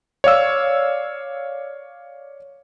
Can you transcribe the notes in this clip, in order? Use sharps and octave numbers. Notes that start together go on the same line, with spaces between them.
C#5 D5 F5 E6